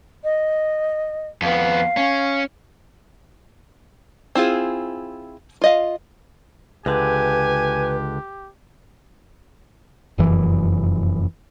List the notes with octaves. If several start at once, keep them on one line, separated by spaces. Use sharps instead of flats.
D#5
F2 B3 F5
C#4
C4 E4 F4 G#4
F4 D#5 F5
C#2 D3 G4 B4 G#5
F1 F#2 E3